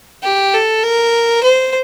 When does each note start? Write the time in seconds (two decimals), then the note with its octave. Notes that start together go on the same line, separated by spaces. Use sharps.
0.24 G4
0.54 A4
0.84 A#4
1.43 C5